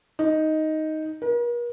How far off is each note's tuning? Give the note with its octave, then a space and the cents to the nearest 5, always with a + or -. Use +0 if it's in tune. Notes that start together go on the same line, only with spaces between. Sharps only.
D#4 +5
A#4 +45